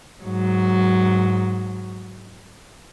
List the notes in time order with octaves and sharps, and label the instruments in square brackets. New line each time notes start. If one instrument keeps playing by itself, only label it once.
[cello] G#2 F#3